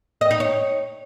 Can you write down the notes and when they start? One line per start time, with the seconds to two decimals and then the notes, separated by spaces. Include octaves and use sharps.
0.21 D#5
0.31 D#4
0.40 C#5